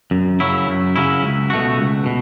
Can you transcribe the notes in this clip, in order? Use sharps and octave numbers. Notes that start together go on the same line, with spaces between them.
F#2
C#3 F#3 C#4 E4
F#2
C#3 F#3 C#4 E4
C#2
B2 A3 F#4
C#2
B2